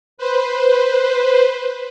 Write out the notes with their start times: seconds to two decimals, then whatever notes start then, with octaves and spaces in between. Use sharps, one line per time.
0.18 B4 C5